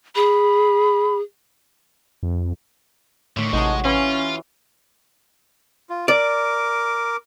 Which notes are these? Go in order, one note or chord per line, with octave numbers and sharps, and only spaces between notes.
G#4 B5
F2
A2 D3 D#3 A3 C#5 B6
A1 C3 G#3 D#4 F#4 A5
E3 C#4 F4
F5
F4
A#4 D5 D6